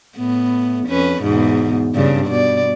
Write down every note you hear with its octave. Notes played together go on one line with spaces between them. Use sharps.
A2 B3
F2 C#4 B4
E2 G#2 B2
G2 C#3 D4
B2 D5